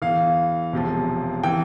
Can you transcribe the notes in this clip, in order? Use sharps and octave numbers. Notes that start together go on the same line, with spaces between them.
E2 E3 F5
E1 E2 C3 F3
E3 G5